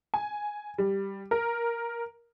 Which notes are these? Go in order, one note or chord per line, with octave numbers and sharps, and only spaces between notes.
G#5
G3
A#4